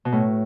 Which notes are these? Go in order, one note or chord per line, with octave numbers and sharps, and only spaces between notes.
B2
A2